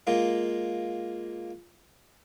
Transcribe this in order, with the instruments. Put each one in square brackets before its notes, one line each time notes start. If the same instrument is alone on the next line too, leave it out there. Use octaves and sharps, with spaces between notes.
[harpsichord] G#3 A#3 F4